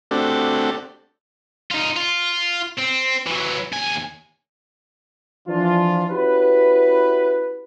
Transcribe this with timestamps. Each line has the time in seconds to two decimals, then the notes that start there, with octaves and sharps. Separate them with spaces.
0.11 A3 C4 D4 F#4 G4 A4
1.71 D#4 F4
1.96 F4
2.78 C4
3.26 E3 F#3
3.72 D#2 G#5
5.48 E3 F3 D4 F4
6.10 C#4 E4 F#4 G4 B4